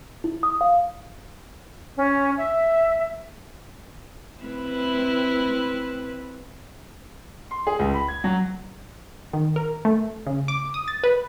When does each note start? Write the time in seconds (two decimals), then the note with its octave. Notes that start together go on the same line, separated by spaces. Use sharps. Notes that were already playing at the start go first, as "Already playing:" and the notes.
0.24 E4
0.43 D#6
0.61 F5
1.97 C#4
2.37 E5
4.41 C4 E4 B4
7.51 C6
7.67 G#4
7.79 C#2
7.94 B5
8.08 G#6
8.24 F#3
9.33 D#3
9.56 A#4
9.85 A3
10.27 C#3
10.48 D6
10.74 D#6
10.88 A6
11.04 B4